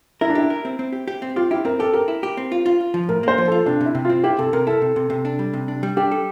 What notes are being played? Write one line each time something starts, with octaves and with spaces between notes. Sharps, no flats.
E4 A#4
D4
E4 G4
A#4
C4
C4
G4
G4
C4
F4 G4
E4 G4
C4 A#4
G4 A4
G4 A#4
E4
G4
C4
F4
F4
F4
F3
A2 A#4
A#3 C5
F3
F4 A4
C3 D4
C3
E4
C3
C4 F4
E4 G4
C3 A4
C3 A#4
E4 A4
C3
C3
C3
D4
G3
C3
D4
G3
D4 G4
A4